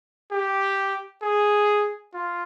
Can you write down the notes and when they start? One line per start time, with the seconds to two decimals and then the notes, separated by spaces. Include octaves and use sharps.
0.31 G4
1.22 G#4
2.14 F4